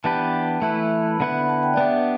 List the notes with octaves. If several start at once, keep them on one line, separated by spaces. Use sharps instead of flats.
E3 B3 D4 G4 B4 A5
E3 A3 E4 B4 A5
D3 B3 E4 B4
A5
G5
D5
B3 D4 G4 E5